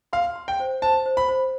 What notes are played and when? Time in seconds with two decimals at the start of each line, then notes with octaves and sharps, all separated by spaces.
0.13 F5 C6
0.36 C6
0.48 G5
0.60 C5
0.82 C5 A5
1.06 C5
1.17 B5
1.28 C5